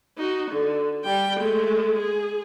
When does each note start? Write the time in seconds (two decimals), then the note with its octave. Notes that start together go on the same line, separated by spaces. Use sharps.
0.18 D#4 F#4
0.51 D3
1.04 G3 G5
1.39 G#3 A3
1.98 G#4